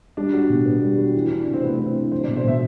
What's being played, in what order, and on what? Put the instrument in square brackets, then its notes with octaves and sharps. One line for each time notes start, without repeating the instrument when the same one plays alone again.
[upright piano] G3 [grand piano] D4
[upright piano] F#4
B2
B3
G3
F#4
E3
D4
C3
[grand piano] C4
[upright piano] A3 [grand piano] B3
[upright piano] E3 [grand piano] C4
[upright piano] D4
[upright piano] F#3 [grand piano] C5
[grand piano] D5
[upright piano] B2
[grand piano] C5
[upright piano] B2 [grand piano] E5